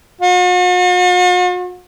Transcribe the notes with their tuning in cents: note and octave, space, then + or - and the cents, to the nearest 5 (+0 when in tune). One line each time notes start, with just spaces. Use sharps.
F#4 -45